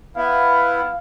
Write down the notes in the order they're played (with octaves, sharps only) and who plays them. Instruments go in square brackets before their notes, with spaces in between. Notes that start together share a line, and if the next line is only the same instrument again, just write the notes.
[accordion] B3 E4 [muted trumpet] F5